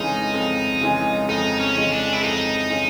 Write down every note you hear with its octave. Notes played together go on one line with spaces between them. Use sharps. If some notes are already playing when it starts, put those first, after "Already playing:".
Already playing: F2 C#3 E3 G#3 D#4
F2
C#3 E3 G#3
F2 D#4
C#4
C#3 E3 G#3
D4
E4
F2 D#4
C#3 E3 G#3